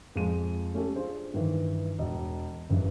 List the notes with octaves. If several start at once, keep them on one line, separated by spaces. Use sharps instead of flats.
F2 F3 G#3 D#7
A3 C#4 G4 A4
D4 F4 G#4 C5
G2 D#3 E3
E1 D#5
F#1 G2 E3